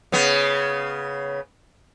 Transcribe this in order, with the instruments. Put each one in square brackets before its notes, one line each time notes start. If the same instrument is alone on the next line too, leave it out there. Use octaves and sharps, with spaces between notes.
[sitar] C#3 B3